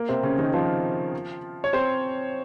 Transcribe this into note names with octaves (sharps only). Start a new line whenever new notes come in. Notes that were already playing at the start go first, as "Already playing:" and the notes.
Already playing: A#3
C3 C4
C#3 C#4
D#3 D#4
F3 F4
C#5
C4 C5